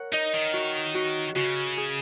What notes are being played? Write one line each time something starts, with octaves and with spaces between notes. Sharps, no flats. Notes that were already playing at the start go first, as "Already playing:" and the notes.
Already playing: A#4 C#5 F#5
D#4 D#5
D#3
F#4
F#4
C#3 F#4
G#4